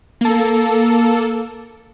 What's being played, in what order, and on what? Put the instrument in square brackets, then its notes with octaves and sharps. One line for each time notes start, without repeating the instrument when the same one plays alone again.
[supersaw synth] A#3 A4